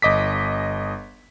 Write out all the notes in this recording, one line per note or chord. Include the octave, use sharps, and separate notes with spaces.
G1 D#5 D6 B6